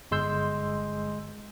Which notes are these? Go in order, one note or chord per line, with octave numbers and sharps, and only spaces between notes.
G1 G#3 C6 E6 G6